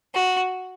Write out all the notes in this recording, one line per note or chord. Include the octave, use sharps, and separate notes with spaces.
F#4